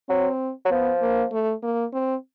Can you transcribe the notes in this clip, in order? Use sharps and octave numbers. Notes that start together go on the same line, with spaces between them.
F#3 C4
F#3
F3 B3
A#3
A3
A#3
C4